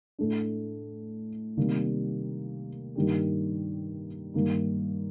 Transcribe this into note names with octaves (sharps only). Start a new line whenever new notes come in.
A2 A3 D4
C3 D#3 G3 A#3
G2 D#3 A#3 D4 G4
G2 D#3 A#3 D#4